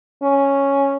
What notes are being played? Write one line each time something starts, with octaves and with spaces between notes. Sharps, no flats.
C#4